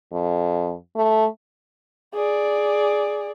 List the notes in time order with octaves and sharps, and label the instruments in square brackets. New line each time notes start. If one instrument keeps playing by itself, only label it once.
[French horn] F2
A3
[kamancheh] G#4 D5